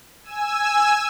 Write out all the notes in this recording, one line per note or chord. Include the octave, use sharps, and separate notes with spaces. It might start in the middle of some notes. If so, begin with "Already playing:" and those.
G#5 E6